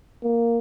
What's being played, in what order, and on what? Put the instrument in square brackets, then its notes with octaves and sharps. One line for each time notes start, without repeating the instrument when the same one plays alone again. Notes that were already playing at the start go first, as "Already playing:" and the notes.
[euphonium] A#3